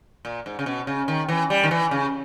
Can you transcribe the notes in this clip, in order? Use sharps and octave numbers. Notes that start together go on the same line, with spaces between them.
A#2
G#2
C#3
B2
C#3
D#3
E3
G3
D#3
E3
C#3